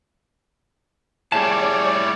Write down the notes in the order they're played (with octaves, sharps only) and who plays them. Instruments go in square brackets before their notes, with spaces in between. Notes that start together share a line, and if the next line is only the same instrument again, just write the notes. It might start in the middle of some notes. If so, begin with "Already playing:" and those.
[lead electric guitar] A2 G3 [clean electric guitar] G#4 A5 [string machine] C#5 D5